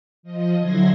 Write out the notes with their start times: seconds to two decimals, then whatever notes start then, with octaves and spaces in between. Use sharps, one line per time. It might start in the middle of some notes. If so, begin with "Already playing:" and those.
0.23 F3 D#5
0.58 D3 F#3 E4 C6 G#6 A#6